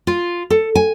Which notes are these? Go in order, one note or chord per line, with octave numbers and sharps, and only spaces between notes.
F4
A4
G#5